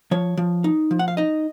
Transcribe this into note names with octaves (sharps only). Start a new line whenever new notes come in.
F3 C#5
F3
D#4
F3
F#5
F5
D#4 D#5